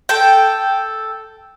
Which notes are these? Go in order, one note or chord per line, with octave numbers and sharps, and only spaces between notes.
A4 G5